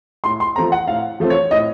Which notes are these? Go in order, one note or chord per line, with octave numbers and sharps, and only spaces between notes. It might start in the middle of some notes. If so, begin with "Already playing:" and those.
A2 C6
C6
F3 A3 C4 A#5
F#5
A2 F5
F3 A3 C4
C#5
A2 D#5